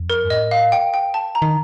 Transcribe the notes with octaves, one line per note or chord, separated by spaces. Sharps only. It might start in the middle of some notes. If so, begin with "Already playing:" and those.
Already playing: F2
A#4
G2
A2 D#5
F5
G5
G5
A5
A#5
D#3